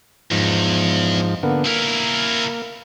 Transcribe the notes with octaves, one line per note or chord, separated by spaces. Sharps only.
E2 G#2 F3
D3 A#3 B3
A#3 E4 A#4